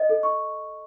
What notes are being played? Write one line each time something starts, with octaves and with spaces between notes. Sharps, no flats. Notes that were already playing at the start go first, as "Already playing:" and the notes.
Already playing: D#5
A4
C#6